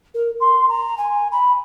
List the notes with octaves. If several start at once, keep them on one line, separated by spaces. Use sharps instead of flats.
A#4
C6
A#5
G#5
B5